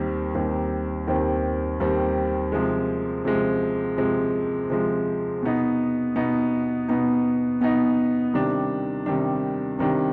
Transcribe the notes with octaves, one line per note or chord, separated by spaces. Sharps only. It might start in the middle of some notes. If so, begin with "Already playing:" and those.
Already playing: D#2 D#3 G3 C4
D#2 D#3 G3 C4
D#2 D#3 G3 C4
D#2 D#3 G3 C4
C3 F3 G#3
C3 F3 G#3
C3 F3 G#3
C3 F3 G#3
B2 B3 D#4
B2 B3 D#4
B2 B3 D#4
B2 B3 D#4
C3 D#3 G3 D4
C3 D#3 G3 D4
C3 D#3 G3 D4